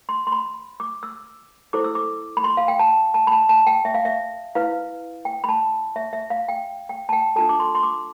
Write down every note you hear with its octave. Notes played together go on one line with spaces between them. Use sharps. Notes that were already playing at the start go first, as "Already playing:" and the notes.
C6
C6
B5
D6
E6
E4 A4 C5 D6
E6
D6
B5
C6
F5
G5
A5
A5
B5
A5
A5
G5
E5
F5
E5
E4 B4 F5
G5
B5
A5
E5
E5
F5
G5
G5
A5
G5
D4 F4 A4 A5
D6
C6
C6
D6